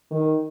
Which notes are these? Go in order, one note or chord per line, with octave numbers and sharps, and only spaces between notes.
D#3